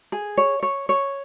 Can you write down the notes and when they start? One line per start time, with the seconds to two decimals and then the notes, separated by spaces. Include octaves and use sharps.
0.12 G#4
0.38 C#5
0.63 C#5
0.89 C#5